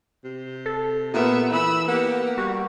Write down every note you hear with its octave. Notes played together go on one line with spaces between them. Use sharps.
C3
A4
A#2 B3 E5
E3 B5 E6
A#3 B3 G4
G3 F#4